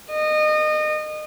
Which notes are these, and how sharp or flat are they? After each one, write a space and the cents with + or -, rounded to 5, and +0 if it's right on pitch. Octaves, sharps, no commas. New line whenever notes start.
D#5 -25